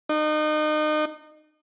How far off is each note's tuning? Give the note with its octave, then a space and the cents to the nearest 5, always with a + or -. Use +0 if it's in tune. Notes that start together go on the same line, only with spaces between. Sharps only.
D#4 -30